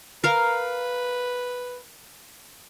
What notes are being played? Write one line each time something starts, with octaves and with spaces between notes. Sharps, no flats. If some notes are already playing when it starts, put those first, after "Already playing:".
A#4 B4 F5